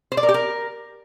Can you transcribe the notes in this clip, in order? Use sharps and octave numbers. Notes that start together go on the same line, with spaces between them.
C5
D5
A#4
G4
A#4